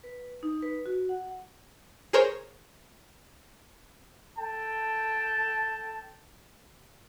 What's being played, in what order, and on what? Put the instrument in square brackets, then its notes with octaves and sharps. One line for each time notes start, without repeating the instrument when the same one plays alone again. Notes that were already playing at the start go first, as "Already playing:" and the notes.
[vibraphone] B4
D#4
B4
F#4
F#5
[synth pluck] G#4 A#4 C5 C#5
[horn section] A4 G5 A5